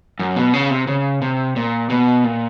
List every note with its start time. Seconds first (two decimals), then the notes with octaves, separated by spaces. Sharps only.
0.19 F#2
0.36 B2
0.53 C#3
0.70 C3
0.87 C#3
1.22 C3
1.56 A#2
1.90 B2
2.24 A#2